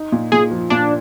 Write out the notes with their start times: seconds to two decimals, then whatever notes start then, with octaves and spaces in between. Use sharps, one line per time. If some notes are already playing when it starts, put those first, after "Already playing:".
Already playing: D#4
0.12 A#2
0.32 A#2 G#4
0.51 F3
0.70 A#2 D4